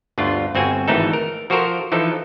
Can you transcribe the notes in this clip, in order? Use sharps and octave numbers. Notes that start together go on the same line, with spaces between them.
G1 D2 D4 F4
G1 C4 F#4 G#5
G#1 E3 A3 D#4 A4
A#4
F3 F#4 A4 A#4 C5
E3 F3 D#4 A4